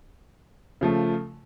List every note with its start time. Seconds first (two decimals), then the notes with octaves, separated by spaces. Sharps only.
0.81 C#3 F3 A3